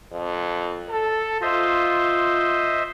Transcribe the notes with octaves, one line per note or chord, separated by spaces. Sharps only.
F2
A4
F4 C5 D#5 E5